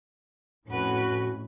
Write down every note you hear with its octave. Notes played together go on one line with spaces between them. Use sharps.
F2 A2 C#4 F#4 B4